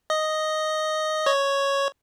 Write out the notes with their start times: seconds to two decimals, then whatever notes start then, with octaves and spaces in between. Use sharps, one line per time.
0.10 D#5
1.26 C#5